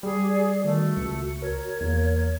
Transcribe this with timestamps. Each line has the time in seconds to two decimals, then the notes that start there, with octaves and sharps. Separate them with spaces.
0.03 G3 G4 G#4
0.28 D5
0.64 D#3 A3 F#4
0.97 C#2 C#7
1.42 A#4 C#5
1.81 E2 A#3